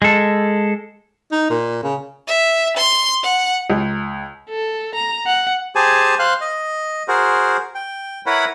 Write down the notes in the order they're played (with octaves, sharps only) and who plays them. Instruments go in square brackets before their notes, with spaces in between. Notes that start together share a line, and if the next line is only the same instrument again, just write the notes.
[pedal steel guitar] G#3 A4
[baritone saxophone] D#4
A#2
C#3
[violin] E5
C6
F#5
[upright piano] C#2
[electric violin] A4
A#5
F#5
[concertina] G4 G#4 C5 G#5 A5
C5 F5 C6 F#6
D#5
F#4 G#4 A#4 C5
G5
E4 A#4 B4 C#5 F#5 B5